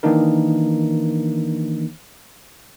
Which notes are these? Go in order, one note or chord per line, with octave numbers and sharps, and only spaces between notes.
D#3 E3 A#3 D4 D#4 A#4